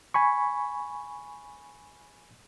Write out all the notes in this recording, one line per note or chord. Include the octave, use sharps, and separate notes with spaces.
G#5 B5 C#6